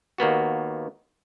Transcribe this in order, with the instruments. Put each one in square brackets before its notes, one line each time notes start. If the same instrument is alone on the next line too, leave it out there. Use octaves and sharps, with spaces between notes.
[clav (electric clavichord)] D#2 A#3 B3 F#4